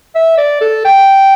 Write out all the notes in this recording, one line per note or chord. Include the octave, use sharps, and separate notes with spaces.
E5
D5
A4
G5